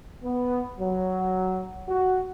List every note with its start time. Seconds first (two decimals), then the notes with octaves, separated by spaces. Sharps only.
0.24 B3
0.80 F#3
1.89 F#4